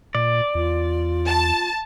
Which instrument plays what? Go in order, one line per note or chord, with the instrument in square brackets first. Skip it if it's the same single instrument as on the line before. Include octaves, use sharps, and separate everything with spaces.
[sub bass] A#2 [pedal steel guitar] D5
[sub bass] E2 [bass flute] F4
[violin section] A5